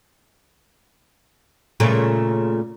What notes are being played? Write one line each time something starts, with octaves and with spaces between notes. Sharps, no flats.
A#2 C#3 A3